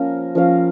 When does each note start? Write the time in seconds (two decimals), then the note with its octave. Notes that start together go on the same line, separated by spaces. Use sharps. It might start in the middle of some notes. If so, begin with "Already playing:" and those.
Already playing: F3 A#3 C#4 A#4
0.35 F3 C#4 A#4 F5